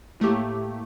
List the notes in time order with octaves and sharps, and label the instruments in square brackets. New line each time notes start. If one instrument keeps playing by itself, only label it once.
[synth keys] A2 A3 A#3 G4